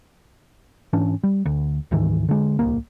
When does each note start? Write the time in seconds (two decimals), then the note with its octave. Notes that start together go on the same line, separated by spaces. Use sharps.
0.93 G#2 E3 C#4 D4
1.24 G3
1.46 D2
1.91 D2 G#2 D#3 E3
2.29 D3 G#3
2.59 D1 C2 A#3